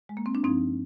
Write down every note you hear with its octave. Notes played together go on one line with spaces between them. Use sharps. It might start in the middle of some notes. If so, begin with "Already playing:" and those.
G#3
A#3
C4
D4
G2 F3 C4 D#4